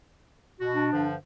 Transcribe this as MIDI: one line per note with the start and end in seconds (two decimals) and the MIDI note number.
0.60 0.87 47
0.60 0.87 66
0.74 1.07 62
0.93 1.15 43
0.93 1.15 50
0.93 1.15 53